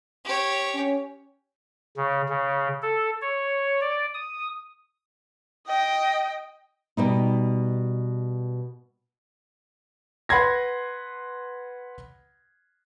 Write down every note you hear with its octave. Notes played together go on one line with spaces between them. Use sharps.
G4 C#5
C#4
C#3
C#3
A4
C#5
D5
D#6
D#5 G5
B2 G3 D#4
B4 F#5 B5 C6 G#6 A#6